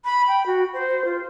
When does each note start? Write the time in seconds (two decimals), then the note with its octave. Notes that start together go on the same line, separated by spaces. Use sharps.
0.05 B5
0.28 G5
0.46 F#4
0.74 C5
1.05 F4